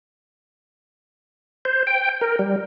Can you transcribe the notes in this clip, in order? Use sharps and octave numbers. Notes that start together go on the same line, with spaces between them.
C5
G5
A#4
G3